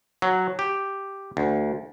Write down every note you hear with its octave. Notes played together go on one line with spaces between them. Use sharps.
F#3
G4
D2